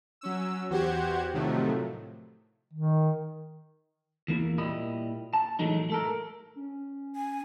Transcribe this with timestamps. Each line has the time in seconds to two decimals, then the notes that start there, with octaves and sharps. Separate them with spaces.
0.21 F#3 C#4 E6
0.70 E2 F#4 G4 C5 F#5 G#6
1.33 A2 C3 D#3 F3 F#3 A3
2.73 D#3
4.28 E2 A#3 E4
4.58 A#2 G3 E4 D#5 B5
5.34 A5
5.59 A2 E3 F#3 G#3 A3 D#4
5.90 A3 A4 A#4
6.56 C#4
7.16 G#5